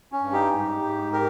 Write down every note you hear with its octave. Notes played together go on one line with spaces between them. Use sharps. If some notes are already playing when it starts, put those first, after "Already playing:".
C#4
G2
D#4 G4
G#2
G#2
G4 A#4